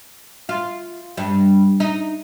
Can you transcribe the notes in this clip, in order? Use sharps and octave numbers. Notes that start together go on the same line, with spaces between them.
F4
G2
D#4